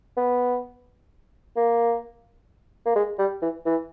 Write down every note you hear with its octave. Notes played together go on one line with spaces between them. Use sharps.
B3
A#3
A#3
G#3
G3
E3
E3